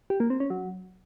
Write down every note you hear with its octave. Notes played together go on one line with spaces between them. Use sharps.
G4
A#3
C4
C#4
F#3